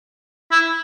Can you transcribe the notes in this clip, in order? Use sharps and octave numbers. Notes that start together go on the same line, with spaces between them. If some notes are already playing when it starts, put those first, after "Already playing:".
E4